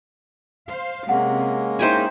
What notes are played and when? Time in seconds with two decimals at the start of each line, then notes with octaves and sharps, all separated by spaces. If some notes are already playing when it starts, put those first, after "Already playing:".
0.69 C5 F5
1.09 C3 G#3 A#3 C#4 F#5
1.79 D#4 E4 C5 G5 G#5